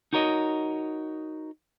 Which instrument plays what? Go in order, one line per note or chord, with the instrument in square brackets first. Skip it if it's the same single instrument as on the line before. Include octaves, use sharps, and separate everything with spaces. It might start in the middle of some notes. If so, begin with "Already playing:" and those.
[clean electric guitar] D#4 F#4 A#4 C#5 D#5